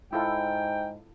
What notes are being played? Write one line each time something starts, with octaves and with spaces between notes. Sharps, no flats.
G#2 E4 F4 A4 G5